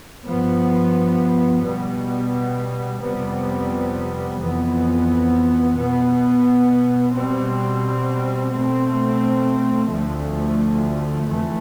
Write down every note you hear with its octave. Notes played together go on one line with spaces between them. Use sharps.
G2 F3 B3
B2 G3 B3
F2 C3 G3 B3
F2 E3 B3
B2 B3
B2 G3 C4
B2 A3 C4
D2 D3 F3 A3
F2 E3 A3